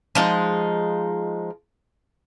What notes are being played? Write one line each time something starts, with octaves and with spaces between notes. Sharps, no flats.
F3 G#3 D#4